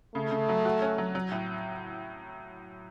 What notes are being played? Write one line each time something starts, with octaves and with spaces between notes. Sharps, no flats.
C#3 A3
C#3
F#3
F#4
C#4
F#3
F#3
A2